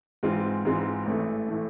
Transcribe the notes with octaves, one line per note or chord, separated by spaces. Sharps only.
G#2 E3 G#3 C4 F4
G#2 E3 G#3 C4 F4
A1 A2 E3 A3
A2 E3 A3